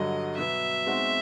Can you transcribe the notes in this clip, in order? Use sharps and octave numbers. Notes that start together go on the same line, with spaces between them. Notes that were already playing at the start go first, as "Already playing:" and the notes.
Already playing: G2 D3 F#3 D#5
B2 F#3 B3 E5
B2 G#3 C4 D#4 F#4